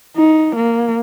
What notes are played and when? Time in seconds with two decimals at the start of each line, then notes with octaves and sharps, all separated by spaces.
0.16 D#4
0.56 A#3